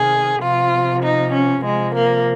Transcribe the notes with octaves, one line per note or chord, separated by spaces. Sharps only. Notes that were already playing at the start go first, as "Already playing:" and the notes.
Already playing: C3 D#3 G#4
C3 F3 F4
D#4
C#4
C3 F3 G#3
A#3